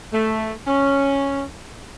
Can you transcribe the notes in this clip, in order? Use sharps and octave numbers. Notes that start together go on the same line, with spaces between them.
A3
C#4